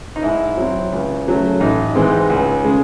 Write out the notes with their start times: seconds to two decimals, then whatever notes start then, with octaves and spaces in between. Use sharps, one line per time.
0.16 D#4
0.23 G#2 E4
0.57 F#3 C4
0.92 C#2
1.26 C#3 F#3 A3
1.60 A1 D#4
1.95 G#2 E3 G#3 C4
2.30 C#2
2.65 C#3 G#3